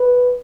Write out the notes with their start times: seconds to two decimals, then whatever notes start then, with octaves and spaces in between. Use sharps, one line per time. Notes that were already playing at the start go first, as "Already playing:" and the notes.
Already playing: B4